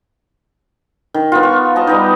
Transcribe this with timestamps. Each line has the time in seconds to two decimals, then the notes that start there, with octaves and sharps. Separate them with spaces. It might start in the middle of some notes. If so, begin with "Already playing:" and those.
1.14 D#3
1.32 B3 F4
1.43 C#6
1.76 D#5 A5 A#5
1.87 G3 B3 D#4